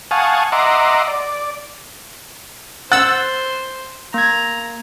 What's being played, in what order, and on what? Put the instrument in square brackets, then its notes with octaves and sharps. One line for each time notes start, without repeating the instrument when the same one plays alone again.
[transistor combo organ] F5 F#5 G#5 A5 C#6 D#6
D#5 E5 F#5 A#5 C6 D6
D5
[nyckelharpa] C5 [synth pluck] F#5 E6 [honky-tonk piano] F#6 A6
[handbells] A#3 G#6 [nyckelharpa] A#5